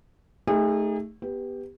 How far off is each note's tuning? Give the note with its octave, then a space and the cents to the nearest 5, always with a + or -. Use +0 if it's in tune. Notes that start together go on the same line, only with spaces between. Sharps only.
A3 +0 D#4 +0 G#4 -40
B3 +0 G4 +10